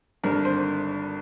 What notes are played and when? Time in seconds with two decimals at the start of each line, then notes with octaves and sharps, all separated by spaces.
0.23 G#1 G2 D3 A#4
0.45 C5